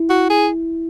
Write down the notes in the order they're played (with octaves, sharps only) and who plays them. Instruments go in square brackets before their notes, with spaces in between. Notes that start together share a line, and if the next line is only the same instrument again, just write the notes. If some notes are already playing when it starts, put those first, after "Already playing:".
Already playing: [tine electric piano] E4
[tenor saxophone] F#4
G#4